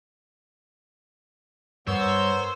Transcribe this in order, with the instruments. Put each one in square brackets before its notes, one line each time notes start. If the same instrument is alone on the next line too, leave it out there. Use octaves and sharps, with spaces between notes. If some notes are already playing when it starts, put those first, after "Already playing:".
[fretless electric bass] G2 [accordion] B3 E6 [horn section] A#4 C#5 [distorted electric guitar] C5